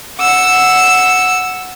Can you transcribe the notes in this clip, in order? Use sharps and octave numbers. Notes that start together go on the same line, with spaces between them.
F#5 E6